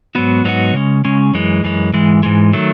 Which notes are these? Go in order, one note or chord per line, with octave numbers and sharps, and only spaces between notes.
G#2 F#3 B3 D#4 F#4
G#2 F#3 B3 D#4 F#4
C#3 G#3 C#4
C#3 G#3 C#4
F#2 E3 G#3
F#2 E3 G#3
G#2 E3 G#3
G#2 E3 G#3
D#3 F#3 A3